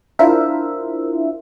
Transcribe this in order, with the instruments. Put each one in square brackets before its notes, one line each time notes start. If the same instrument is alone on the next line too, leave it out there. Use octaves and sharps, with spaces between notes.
[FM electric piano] D4 E4 F4 A#4 C5 E5